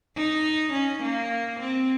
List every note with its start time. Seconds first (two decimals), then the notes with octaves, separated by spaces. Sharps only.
0.16 D#4
0.73 C#4
1.03 A#3
1.60 C4